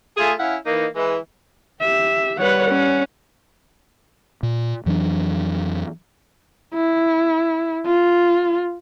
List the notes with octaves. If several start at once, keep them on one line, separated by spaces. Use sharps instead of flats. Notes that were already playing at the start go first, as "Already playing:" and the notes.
A3 F4 G#4
C#4 E4 F5 F#5
E3 A#3 D#4
E3 G#3
G4 E5
G3 B4 C#5 F#5
C#4
A#2
F2 E3 F#3 D4
E4
F4